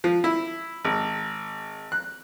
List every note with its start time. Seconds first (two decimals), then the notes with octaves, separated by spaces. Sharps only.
0.04 F3
0.24 E4
0.85 G#1
1.92 F#6